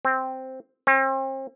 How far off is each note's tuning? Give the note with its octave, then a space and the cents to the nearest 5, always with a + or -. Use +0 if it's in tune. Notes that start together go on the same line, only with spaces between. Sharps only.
C4 +0
C4 +40